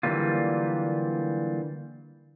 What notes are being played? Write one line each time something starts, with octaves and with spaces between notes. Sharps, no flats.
D3 E3 F#3 G3 A#3 F4